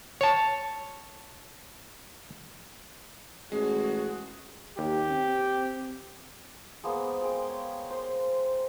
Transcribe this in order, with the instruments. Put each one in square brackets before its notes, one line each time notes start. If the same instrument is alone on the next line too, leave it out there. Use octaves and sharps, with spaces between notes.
[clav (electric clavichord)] C#5 A5
[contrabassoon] A1 [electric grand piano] G#3 [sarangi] F#4 [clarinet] G#4
[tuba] D#2 [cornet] G4
[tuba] C4
[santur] G#3 A#3 B3 C5
G#3 G5
C#5
C5